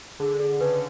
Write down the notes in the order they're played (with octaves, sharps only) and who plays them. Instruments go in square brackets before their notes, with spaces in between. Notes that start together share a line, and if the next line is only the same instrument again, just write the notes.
[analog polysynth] D3 [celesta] G#4
[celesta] G#4
[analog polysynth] C#3 [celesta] B4